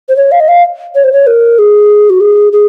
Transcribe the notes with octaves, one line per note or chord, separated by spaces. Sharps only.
C5
C#5
F5
D#5
F5
C#5
C5
C#5
A#4
G#4
F#4
G#4
G#4